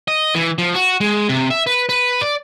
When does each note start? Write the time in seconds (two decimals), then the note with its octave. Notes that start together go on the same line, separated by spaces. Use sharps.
0.08 D#5
0.35 E3
0.58 F3
0.74 F#4
1.01 G#3
1.29 C3
1.50 E5
1.67 B4
1.89 B4
2.21 D5